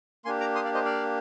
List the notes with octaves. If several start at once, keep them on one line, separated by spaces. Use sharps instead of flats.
A#3 D4 G4 G#5 C6
A#5 D6
C6 D#6
D5 F5
C5 D#5
D5 F5